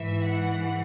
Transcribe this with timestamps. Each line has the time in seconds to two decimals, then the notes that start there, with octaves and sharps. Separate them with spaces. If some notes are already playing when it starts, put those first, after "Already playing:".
Already playing: G#2 E3 E5
0.25 F#5